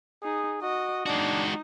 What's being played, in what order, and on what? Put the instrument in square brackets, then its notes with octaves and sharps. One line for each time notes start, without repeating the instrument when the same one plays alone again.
[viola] D#4 [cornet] G#4
[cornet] F#4 [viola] D#5
[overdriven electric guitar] G#3 F#4 [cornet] D4 [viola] D#4